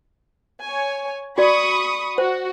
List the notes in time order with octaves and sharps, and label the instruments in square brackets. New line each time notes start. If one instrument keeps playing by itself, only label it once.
[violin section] C#5 G#5
[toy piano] F#4 D5 [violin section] B5 C#6 D#6
[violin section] F#4 [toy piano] C5